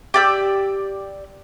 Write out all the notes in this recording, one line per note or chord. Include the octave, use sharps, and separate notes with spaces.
G4 D5 E6